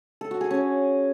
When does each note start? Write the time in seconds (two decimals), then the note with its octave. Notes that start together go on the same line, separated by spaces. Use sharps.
0.21 A4
0.31 F#4
0.41 G#4
0.51 C#4